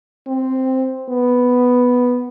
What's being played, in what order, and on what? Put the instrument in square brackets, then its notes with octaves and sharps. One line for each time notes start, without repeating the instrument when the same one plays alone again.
[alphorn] C4
B3